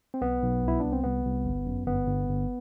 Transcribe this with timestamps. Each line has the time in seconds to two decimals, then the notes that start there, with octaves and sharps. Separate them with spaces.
0.14 C4
0.22 B1 B3
0.42 B1
0.63 C2
0.68 E4
0.80 C2 D4
0.92 C4
1.04 C2 B3
1.25 C2
1.45 G1
1.66 F#2
1.86 G1 B3
2.07 G1
2.28 G1